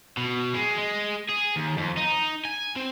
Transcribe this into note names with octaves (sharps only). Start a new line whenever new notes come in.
B2
G#3
G#3
G#4
D#2
F2
D#4
G#5
C4